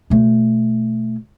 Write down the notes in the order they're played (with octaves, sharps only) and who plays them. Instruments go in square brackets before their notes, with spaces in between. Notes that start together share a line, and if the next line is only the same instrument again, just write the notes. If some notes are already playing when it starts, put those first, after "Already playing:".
[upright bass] B2 A3